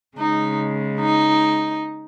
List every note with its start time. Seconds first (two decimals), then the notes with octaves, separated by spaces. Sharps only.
0.17 C#3 G#3 D#4
1.00 D#4